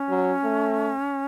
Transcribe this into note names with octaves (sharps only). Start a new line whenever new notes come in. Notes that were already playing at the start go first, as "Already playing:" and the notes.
Already playing: C#4
F#3
A3